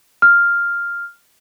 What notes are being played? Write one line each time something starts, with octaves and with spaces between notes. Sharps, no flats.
F6